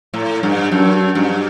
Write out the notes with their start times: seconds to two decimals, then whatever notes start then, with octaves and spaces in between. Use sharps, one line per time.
0.14 A2
0.43 G2
0.72 F#2
1.15 G2